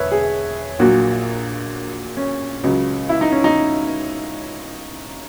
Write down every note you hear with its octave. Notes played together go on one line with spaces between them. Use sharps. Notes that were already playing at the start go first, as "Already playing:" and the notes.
Already playing: E1 B4 C#5 E5
G#4
A#1 A#2 F#3 F#4
C#4
C#2 C#3 F#3
E4
D#4
C#4
D#4